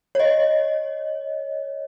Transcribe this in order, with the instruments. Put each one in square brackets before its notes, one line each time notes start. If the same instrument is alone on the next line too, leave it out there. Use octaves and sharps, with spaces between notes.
[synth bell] C#5 D#5